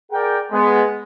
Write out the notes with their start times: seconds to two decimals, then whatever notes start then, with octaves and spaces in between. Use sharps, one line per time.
0.11 G#4 A#4 D5 F#5 G5
0.52 G#3 B3